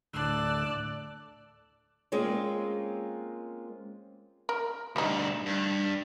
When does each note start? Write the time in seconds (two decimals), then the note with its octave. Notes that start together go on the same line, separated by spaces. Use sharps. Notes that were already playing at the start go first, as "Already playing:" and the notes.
0.14 D2 A2 D5 A5 E6 F#6
2.12 G#3 A#3 C4 C#4 F4
4.49 A#4
4.96 D2 G2 G3 D#4
5.46 G2